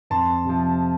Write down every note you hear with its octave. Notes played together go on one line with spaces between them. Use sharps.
F2 A5 C6
C3 F3